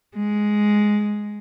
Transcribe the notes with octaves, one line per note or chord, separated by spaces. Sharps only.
G#3